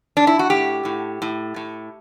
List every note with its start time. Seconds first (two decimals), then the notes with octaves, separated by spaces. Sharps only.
0.17 D4
0.27 E4
0.39 F#4
0.50 A2 G4
0.85 A2
1.22 A2
1.56 A2